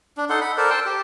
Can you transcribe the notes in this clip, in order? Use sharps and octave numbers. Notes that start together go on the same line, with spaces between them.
D4
D#4 A4 F#5 C6
F#5 B5
A4 A#4 C5 D5
C5 G5 A5 C6
G4